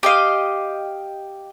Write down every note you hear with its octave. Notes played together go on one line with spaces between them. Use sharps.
G4 D#5 F5